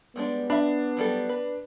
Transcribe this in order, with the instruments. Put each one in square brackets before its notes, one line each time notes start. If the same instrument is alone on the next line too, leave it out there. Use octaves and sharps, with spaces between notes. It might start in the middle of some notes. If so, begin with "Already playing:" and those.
[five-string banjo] G3 G#3 D4 [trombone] B3
[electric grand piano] D4 [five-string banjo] E5 B5
[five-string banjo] F#3 G3 A4
B4